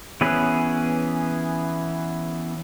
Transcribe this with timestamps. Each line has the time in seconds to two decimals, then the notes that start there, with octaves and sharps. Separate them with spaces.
0.21 E3 B3 C#4 G#4 B4